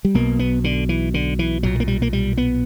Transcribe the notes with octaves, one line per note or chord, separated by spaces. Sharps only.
G3
B1 B2 A#3
B3
D3
E3
D3
E3
B1 A#2 F#3
A#3
G3
A#3
G3
B3